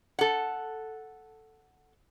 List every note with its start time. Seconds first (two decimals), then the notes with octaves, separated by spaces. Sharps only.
0.19 A4 F#5